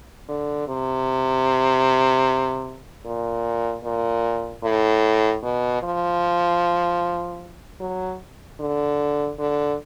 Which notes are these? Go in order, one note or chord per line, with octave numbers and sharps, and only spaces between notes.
D3
C3
A#2
A#2
A2
B2
F3
F#3
D3
D3